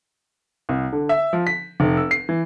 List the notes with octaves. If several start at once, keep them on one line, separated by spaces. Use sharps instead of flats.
C2
D3
E5
F3
B6
F1
E6
C7
E3